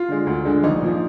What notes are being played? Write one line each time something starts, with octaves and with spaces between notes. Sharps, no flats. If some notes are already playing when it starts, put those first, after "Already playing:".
Already playing: F4
D3 G#3
D2
D3 G#3
A#1 D#4
A#2 F3